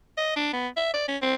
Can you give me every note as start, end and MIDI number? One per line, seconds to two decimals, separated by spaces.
0.17 0.33 75
0.36 0.50 62
0.53 0.68 59
0.77 0.92 76
0.94 1.07 74
1.08 1.17 61
1.22 1.35 60